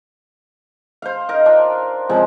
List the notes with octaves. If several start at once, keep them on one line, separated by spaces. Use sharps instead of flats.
C5 F5
D#4 A#4 D#5
D4 F4
C#3 F3 G#3 C4